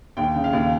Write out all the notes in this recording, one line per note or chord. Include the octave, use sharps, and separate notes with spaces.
D#2 G5
C#3
F5
D#2